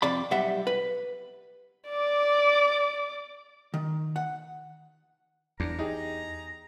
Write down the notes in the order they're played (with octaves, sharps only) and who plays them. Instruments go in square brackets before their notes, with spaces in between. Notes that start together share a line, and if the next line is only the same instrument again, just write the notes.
[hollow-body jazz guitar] F2 C3 D5 B5
B1 G3 E5 F#5
B4
[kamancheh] D5 D6
[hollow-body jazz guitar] D#3
F#5
[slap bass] E2 [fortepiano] D4 [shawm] A#5
[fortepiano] D#4 G4 G#4